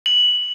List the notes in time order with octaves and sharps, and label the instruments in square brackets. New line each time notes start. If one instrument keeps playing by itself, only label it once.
[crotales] F#7